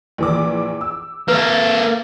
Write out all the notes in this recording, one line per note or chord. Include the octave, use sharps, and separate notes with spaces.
A#1 E3 D6
E6
A#3 A4 B4